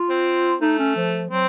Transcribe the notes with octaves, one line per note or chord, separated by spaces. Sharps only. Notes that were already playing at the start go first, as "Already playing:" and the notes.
Already playing: F4
C4
A3 D#4
C#4
F3
F#3 C4